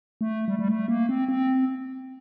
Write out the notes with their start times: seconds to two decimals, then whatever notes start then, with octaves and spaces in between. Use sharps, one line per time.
0.21 A3
0.48 G3
0.59 G3
0.68 A3
0.88 A#3
1.09 C4
1.29 C4